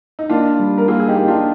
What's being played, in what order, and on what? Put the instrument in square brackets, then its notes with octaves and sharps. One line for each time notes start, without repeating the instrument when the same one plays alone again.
[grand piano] D#4
[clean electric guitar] A#3 [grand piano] D4 F4
[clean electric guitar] G3
[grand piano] A#4
[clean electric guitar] A#3 [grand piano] F4 G#4
[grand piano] G#4
D#4 G4
[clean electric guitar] A#3
[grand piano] D4 F4